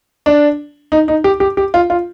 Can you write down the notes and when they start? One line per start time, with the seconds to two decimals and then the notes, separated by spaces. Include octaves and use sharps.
0.26 D4
0.92 D#4
1.08 D#4
1.24 G4
1.40 G4
1.57 G4
1.74 F4
1.90 F4